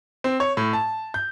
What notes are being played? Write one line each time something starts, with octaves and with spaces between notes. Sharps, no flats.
C4
C#5
A2
A5
G6